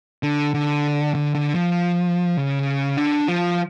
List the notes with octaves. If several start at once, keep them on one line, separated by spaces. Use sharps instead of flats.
D3
D3
D3
D3
F3
C#3
D3
F3